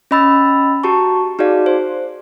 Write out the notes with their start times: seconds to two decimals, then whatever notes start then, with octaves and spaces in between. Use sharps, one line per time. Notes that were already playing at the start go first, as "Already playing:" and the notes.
0.11 C#4 D#5 B5 E6 A6
0.83 F#4 G4 A5 A#5 C#6
1.39 D#4 F#4 G#4 D5 F5
1.66 C5 C6